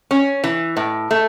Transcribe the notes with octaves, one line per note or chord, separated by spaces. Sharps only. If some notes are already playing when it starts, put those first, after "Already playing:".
C#4
E3
A2
A3